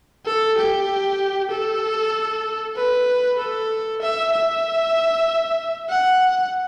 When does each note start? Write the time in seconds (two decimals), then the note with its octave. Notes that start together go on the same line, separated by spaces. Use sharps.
0.26 A4
0.58 G4
1.51 A4
2.76 B4
3.38 A4
4.01 E5
4.32 E5
5.89 F#5